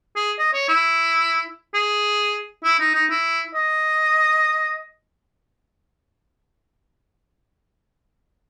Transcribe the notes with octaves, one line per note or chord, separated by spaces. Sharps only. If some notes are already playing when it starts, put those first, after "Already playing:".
G#4
D#5
C#5
E4
G#4
E4
D#4
D#4
E4
D#5